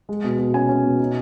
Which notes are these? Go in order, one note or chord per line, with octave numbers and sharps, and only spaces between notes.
G#3
B2
B2
C#4 G#5
C#4
B2
D#4